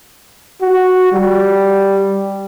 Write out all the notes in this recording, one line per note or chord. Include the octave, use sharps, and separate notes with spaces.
F#4
G3